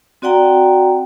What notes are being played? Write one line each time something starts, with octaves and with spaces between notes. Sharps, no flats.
C4 F#4 D5 F#5 G5 A#5